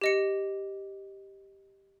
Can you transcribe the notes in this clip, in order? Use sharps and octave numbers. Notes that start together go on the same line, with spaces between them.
G4 D#5 C#7